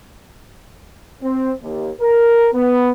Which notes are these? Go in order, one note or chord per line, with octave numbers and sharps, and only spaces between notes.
C4
D#2
A#4
B3